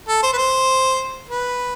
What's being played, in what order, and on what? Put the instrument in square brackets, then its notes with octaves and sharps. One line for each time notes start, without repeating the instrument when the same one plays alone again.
[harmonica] A4
C5
B4
C5
B4